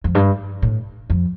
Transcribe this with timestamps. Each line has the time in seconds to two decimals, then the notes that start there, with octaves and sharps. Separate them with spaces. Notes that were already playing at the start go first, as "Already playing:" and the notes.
0.04 F2
0.15 G2
0.62 A2
1.10 F2